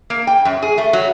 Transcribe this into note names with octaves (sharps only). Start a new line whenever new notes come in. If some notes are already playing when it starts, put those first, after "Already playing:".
A#3
G5
F#2
G#4
A3
F#3